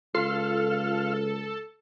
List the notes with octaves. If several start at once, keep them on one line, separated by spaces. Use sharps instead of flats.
C#2 F4 A4 F5 F6